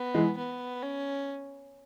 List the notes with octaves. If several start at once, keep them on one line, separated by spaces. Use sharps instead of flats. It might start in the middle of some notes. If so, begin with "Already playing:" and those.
Already playing: B3
E3 G#3
B3
C#4